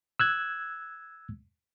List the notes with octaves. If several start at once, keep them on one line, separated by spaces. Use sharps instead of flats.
E6 F#6 G#6